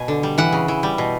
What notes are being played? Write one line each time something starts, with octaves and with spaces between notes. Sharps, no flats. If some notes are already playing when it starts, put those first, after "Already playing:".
Already playing: B2 G#5
D3
G3
E3 F#5
C#3
E3
G3
B2